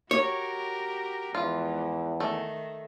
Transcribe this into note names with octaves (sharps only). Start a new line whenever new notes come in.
F#4 G4 A#4 C#5
E2 G#2 E3 F3 F4
D#3 A3